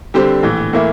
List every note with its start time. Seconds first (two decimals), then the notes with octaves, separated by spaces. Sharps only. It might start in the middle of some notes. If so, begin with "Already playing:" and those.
0.14 D3 G3 C4 G4 C5
0.43 A#1 A2 E3
0.73 A2 E3 A#3 E4